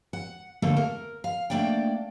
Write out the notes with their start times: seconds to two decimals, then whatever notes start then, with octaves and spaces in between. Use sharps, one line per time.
0.13 F#5
0.62 D3 A3 A#3 A4
0.76 A#4
1.24 F5
1.50 A3 A#3 D4 D5 G5